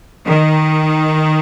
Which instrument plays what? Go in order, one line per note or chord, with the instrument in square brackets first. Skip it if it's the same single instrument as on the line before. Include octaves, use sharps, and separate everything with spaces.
[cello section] D#3